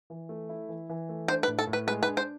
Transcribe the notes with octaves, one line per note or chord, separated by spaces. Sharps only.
E3
A3
E4
E3
E3
A3
D4 C5
B4
A2
A4
A2
B4
G#3 B4
B4
D4
C5